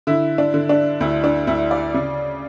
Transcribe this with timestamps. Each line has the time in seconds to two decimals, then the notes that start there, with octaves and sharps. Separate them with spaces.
0.07 D3 E4
0.38 D4
0.54 D3
0.69 D4
1.01 D2 E4
1.24 D4
1.47 D2 E4
1.71 D5
1.94 C#3